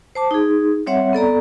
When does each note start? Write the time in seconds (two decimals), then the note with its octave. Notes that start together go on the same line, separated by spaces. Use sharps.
0.15 C5 A5 D6
0.31 D#4 G#4
0.87 G3 C4 C#5 E5 F#5
1.13 B3 A4 D5 A#5